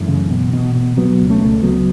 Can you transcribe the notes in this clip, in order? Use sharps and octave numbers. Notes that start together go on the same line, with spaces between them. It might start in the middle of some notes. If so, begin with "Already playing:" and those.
Already playing: F#2 E3 A3
C#3
B2
B2
B2
B2 F#3 B3
C#2
A3 C#4
C#2
C#2 F#3 B3